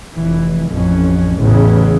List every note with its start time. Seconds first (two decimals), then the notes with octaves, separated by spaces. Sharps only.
0.17 F1 E3
0.69 A1 F2 C#4
1.39 A1 E2 A2 C#3 E3